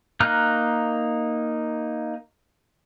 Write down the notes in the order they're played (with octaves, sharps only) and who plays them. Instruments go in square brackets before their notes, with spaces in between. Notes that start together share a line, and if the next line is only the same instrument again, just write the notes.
[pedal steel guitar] A#3 D#4 A#5 F6 F#6